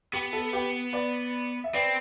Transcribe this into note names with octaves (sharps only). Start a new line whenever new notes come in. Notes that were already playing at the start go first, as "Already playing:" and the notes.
B3 G4
A4
G4 B4
B4 D5
E5
C4 B4 D5